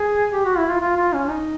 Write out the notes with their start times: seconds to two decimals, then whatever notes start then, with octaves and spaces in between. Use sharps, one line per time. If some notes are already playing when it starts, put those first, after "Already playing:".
Already playing: G#4
0.33 G4
0.46 F#4
0.58 E4
0.69 F4
0.81 F4
0.97 F4
1.13 C#4
1.29 D#4